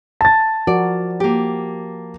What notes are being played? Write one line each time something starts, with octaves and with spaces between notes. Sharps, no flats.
A5 A6
F3 F#4 A#4 D5
A#3 G4